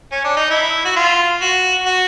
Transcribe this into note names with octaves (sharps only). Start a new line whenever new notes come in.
C#4
D4
D#4
E4
F#4
F4
F#4
F#4